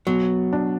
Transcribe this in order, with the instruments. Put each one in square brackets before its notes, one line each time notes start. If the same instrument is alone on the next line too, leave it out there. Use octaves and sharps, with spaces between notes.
[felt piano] B2 [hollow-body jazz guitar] F#3
[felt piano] D4